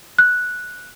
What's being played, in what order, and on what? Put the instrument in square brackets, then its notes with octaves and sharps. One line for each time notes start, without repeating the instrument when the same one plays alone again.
[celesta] F#6